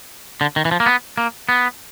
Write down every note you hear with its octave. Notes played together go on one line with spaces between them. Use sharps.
D3
D#3
E3
F3
A#3
B3
A#3
B3